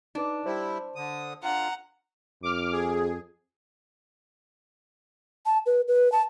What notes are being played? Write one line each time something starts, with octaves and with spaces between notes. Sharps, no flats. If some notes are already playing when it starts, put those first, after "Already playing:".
D4 D#4 B4
G3 E4 C5
D3 D#6
D3 F4 F#5 A#5
F2 D6 F6
G#4
A5
B4
B4
A5